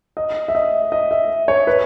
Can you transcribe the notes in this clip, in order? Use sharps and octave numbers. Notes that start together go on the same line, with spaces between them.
D#5
E5
D#5
D#5
E5
C#5
B4